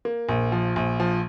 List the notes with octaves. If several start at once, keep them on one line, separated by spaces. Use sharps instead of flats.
A#3
A#1
F3
A#1
F3